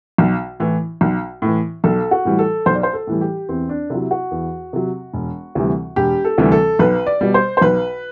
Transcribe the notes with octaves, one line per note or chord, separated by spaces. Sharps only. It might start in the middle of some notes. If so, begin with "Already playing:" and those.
B1
A2 E3
B1
A2 E3
B1 A4
F#4
A2 E3 G3
A4
B1 C5
D5
C5
A4
A2 E3 G3
G4
E2 C4
D4
C3 F#3 E4
F#4
E2
C3 F#3
E1
D2 C3 E3 G3
E1 G4
A4
D2 C3 E3 G3
A4
B1 B4
D5
B2 G3
C5
C5
B1 B4